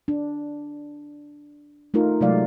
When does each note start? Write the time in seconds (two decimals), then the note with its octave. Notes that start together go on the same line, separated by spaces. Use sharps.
0.08 D4
1.94 A3 D#4 F4 A#4
2.21 C3 F#3 G#3 A3 D5 F5